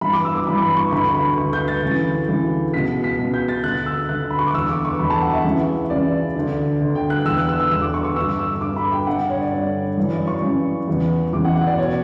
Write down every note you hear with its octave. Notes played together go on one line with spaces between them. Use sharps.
G2 E3 B5
D6
E6
D6
G2 E3 B5
B5
C#6
D2 D3 B5
B5
D2 D3 C#6
G6
A6
D2 C#3 E3
D2 C#3 E3
C#2 B2 B6
B6
C#2 B2
G6
A6
D2 D3 F#6
E6
D2 D3 F#6
B5
C#6
D6
E2 D3 E6
D6
C#6
E2 D3 B5
A5
F#5
E5
C#2 C#3 E3
C#2 C#3 E3 D5
D2 D3
D2 D3
G5
F#6
E2 D3 E6
F#6
E6
E6
E2 D3 E6
D6
C#6
C#6
G2 D3 E6
E6
G2 D3 D6
B5
G5
G2 D3 F#5
C#5
D5
G2 D3
F#2 C#3 E3
D5
C#6
F#2 C#3 E3
E2 C#3 E3
E2 C#3 E3 D6
F#5
F#5
D5
B2 C#5